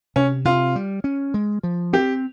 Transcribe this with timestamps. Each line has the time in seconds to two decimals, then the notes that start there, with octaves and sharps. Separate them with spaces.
0.16 C3 C#4
0.45 C3 F4
0.75 G3
1.04 C#4
1.34 G#3
1.63 F3
1.93 C4 G4